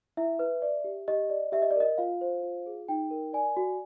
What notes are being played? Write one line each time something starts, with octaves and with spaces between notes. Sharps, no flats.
E4 E5
B4
D5
G4
G4 D#5
D5
G4 E5
D#5
D5
A#4 D#5
F4 F5
C5
F4
G#4
D#4 G5
A#4
D5 G#5
F#4